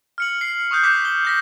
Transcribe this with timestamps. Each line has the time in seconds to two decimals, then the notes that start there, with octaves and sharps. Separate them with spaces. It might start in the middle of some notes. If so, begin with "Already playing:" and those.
0.18 F6 C#7 F#7
0.41 C7 F#7
0.71 C#6 D#6 F#6 G6
0.83 D6 G6 B6 C7
1.05 G7
1.25 G6 A#6 B6